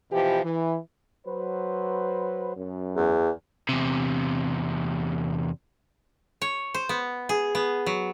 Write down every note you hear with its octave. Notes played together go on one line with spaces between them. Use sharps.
B2 E3 F3 G4
E3
F#3 B4 C5
F#2
E2
E2 C3
C#5
C5
B3
G#4
B3
F#3